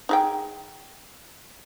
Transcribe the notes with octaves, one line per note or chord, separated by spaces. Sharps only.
D#4 G#4 G5